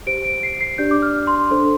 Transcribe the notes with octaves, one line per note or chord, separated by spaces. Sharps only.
G4 C5 D7
D7
C7
C7
D4 G4 D5 G6
D6
F6
C6
D4 A4 C5